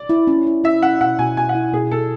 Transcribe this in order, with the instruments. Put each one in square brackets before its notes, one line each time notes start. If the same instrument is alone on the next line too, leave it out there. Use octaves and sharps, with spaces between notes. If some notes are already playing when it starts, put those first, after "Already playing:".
Already playing: [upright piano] D5
[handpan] E4
C#4
E4
[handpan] E4 [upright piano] E5
[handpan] C#4 [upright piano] F#5
[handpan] B2 [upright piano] F#5
[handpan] B2 [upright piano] G#5
[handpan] B2 [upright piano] G#5
[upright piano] F#5
[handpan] E4
[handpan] B2 [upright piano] G#4
[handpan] B2 [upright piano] A4